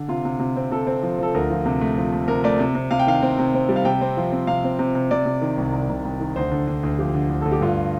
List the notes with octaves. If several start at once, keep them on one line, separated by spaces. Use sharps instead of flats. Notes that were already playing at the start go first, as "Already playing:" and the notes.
Already playing: D3
C3 F4
C3
C3
C4
C3 A4
C4
F3
F3 A4
D2 A#4
F3
C3
A3
F3
A3
C3 A#4
A3 D5
C3
C3
C3 F5
G5
D#3 F5
C4
C3
C4
G3
F5
C3 G5
C4
F3
C4
C3 F5
C4
C3
C3
C3 D5
C3
D#3
C2
C2
C2
C2
D#3
D2 C5
D3
D3
D2
F3 G4
D3
D2
D2 A4
G4
G2 F4